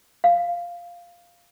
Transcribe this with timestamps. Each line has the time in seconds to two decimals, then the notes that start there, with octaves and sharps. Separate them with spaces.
0.24 F5